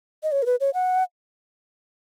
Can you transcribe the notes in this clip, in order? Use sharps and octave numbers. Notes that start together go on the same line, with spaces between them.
D#5
C#5
A#4
B4
C#5
F#5